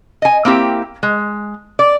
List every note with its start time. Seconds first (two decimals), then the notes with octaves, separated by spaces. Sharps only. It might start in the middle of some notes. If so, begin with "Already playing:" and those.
0.22 D#5 G#5
0.45 A#3 C4 E4 G4
1.03 G#3
1.79 D5